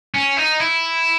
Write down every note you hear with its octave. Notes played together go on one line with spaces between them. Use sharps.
C#4
D#4
E4